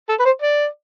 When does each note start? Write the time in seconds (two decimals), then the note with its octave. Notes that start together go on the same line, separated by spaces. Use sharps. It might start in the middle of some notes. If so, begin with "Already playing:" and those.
0.09 A4
0.20 B4
0.25 C5
0.42 D5